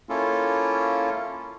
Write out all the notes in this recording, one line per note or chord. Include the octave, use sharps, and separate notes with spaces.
A#3 C#4 E4 F4 A4